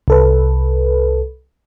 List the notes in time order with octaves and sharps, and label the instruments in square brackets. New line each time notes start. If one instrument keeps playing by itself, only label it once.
[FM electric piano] C2 A4 B4